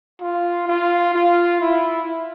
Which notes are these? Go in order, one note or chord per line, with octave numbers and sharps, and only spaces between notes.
F4
F4
F4
E4